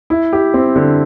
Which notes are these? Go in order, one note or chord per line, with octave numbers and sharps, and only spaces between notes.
E4
G4
C4
D3